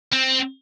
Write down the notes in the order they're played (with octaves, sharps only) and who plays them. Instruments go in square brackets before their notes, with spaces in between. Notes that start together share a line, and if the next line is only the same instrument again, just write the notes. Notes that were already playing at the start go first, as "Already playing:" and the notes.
[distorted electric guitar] C4